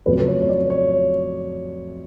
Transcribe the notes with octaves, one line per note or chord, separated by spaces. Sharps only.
F2 C#3 F#3 A3 B4
C#5
C#5
D5
C#5